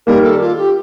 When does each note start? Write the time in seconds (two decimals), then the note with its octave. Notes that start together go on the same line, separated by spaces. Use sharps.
0.07 D#3 G3 A#3 A#4
0.24 A4
0.41 F4
0.57 G4